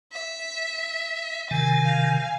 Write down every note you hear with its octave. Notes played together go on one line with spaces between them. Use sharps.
E5
C3 D#3 G#5 A6
F5